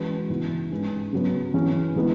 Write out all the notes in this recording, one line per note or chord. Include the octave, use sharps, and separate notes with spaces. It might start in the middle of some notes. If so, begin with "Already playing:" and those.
Already playing: E3 G#3 C#4 F#4 B4
C#3 E3 B3 E4
G#2 G#3 C#4 G#4 B4
C#3 F#3 B3
E3 C#4 G#4
E3 G#3 B3 E4